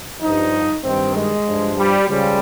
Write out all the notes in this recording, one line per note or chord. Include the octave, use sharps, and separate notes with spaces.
G2 F3 D#4
G2 D#3 C4
G#3
G2 F3
G3
C#2 C#3 F3 G3